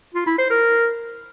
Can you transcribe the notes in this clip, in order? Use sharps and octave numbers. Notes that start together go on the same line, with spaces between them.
F4
E4
C5
A#4